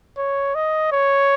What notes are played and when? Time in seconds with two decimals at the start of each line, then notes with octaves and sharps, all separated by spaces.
0.18 C#5
0.55 D#5
0.92 C#5